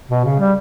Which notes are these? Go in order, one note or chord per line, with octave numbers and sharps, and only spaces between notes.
B2
C#3
G3